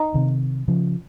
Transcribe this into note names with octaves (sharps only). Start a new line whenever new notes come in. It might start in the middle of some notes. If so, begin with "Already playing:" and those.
Already playing: D#4
C3 D#3
C#3 F3